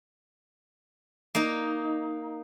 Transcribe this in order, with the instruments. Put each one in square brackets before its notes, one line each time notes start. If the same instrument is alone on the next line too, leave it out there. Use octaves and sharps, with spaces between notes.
[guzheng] A#3 D#4